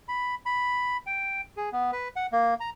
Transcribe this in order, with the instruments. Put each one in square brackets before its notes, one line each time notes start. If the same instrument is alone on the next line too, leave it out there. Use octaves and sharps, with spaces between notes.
[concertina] B5
B5
G5
G#4
B3
B4
F#5
A#3
A#5